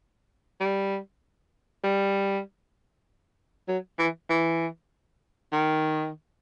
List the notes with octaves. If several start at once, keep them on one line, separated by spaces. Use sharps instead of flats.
G3
G3
F#3
E3
E3
D#3